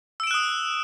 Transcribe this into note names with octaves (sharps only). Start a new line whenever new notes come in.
D#6 E6 F#6 D7 E7